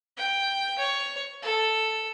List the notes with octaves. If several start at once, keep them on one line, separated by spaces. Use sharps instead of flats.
G5
C#5
A4